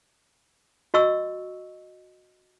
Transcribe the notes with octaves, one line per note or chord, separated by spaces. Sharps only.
F#4 D#5 C#6 E6